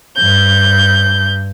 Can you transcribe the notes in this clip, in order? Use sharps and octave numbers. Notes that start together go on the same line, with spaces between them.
G2 G6